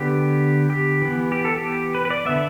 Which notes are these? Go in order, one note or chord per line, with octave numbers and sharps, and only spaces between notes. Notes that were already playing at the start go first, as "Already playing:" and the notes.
Already playing: D3 B3 G4
G4
E3 B3
G4
A4
G4
B4
B4
D5
D3 B3 E5